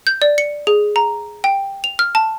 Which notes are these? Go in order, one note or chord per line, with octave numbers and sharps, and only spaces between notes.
G6
D5
C#7
G#4
A#5
G5
F7
F6
A5